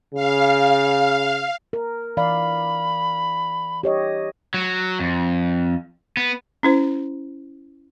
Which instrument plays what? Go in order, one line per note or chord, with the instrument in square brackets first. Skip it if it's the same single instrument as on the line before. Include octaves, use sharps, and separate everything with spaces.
[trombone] C#3 [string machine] F5
[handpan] A#4
[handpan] E3 D5 F5 [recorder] B5
[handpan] G4 C#5 D#5
[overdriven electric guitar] F#3
F2
B3
[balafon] C#4 E4 C5